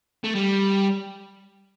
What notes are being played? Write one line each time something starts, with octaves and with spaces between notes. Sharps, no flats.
A3
G3